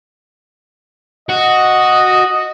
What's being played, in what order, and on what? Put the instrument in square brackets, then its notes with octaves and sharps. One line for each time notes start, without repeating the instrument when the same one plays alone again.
[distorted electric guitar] F#4 [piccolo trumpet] D#5